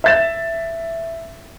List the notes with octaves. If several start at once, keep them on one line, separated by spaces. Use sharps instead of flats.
E5 A6 E7